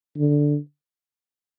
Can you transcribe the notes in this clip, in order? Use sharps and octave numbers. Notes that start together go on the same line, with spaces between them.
D3